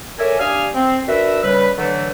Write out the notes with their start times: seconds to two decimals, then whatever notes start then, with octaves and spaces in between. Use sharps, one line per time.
0.19 A4 A#4 C#5 D5 E5 G#5
0.40 D4 G4 F5 G#5 D#6 F6
0.74 C4
1.07 D4 F#4 A#4 B4 E5
1.43 C#3 G3 B4
1.78 D3 E3 F#3 A3